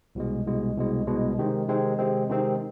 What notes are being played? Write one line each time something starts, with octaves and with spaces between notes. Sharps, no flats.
C2 B2 G#3
C2 B2 G#3
C2 B2 G#3
C2 B2 G#3
C3 D#3 G#3 C4
C3 D#3 G#3 C4
C3 D#3 G#3 C4
C3 D#3 G#3 C4